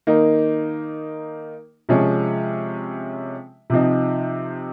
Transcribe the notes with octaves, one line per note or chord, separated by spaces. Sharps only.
D#3 A#3 D#4
C3 F3 G#3 C#4
C3 F3 C4 D#4